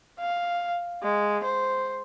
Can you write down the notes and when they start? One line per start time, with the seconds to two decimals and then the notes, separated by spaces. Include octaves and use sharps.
0.20 F5
1.03 G#3
1.44 C5